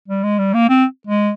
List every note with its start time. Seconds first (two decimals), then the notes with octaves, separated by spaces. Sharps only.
0.08 G3
0.23 G#3
0.39 G3
0.54 A#3
0.69 C4
1.07 G#3